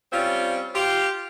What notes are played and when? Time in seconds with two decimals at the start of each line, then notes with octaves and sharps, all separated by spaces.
0.12 G3 C4 C#4 F4
0.74 F4 G4